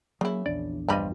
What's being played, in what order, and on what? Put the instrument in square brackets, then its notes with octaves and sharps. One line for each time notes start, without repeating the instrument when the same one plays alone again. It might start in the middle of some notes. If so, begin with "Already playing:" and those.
[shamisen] C#3 E4 [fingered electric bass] F#3 A#3
[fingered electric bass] A#1 E2 D4 [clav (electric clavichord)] D5
[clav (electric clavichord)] G2 G3 D#5 [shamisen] F3 B5